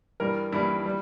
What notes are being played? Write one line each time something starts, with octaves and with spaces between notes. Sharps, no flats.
G2 E3 G3 A#4
G2 E3 G3 E4
G3